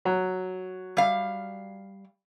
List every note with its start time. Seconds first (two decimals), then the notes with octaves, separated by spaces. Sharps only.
0.05 F#3
0.97 G3 F5